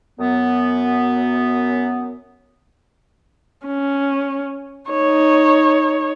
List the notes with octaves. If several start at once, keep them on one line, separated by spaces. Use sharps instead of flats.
F#2 B3
C#4
D#4 C#5